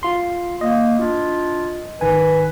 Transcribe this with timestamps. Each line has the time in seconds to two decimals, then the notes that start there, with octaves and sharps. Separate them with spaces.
0.03 F4 C6
0.61 A#3 D#5
0.99 D4 E4 F4
2.01 G#1 D#3 B4 G#5